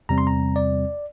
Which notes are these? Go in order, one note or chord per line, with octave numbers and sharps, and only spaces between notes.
E2 C3 G3 C4 A#5
C6
A#5
D5